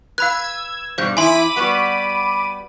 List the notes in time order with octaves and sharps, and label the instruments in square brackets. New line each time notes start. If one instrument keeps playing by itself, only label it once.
[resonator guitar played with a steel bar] B4 [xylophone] F5 B5 F#6 [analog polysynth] E6 G#6
[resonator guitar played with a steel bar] G2 B2 G3 [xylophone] C5 G6
[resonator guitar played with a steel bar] E2 E4 E5 [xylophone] G#5 C6 [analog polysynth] B5 D6 D#7
[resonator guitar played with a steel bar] G3 B3 F#4